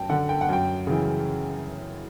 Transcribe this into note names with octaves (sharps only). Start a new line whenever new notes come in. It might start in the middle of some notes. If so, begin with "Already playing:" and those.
Already playing: F#2 G5 A5
D3 F#5
G5
F#5
F#2 G5
C#3 E3